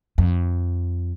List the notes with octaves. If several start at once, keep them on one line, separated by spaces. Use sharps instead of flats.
F2